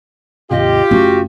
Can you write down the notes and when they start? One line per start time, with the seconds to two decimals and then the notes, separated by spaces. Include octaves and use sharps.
0.51 D#2 G#2 C3 F4 G4 D#5
0.91 F#1 A3 C#4 F#4